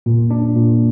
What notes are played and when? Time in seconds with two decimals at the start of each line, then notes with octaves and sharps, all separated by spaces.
0.06 A#2
0.31 D4
0.56 A#2